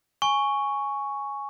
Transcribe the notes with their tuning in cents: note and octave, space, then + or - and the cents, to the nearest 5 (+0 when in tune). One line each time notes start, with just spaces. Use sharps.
G#5 +0 C#6 +0